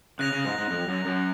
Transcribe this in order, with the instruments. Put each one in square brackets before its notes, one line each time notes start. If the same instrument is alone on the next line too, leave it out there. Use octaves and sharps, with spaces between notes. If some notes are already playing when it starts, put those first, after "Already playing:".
[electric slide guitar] C#3 [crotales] F#6 A#6 F7
[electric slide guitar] C#3
G#2
G#2
F2
F#2
F#2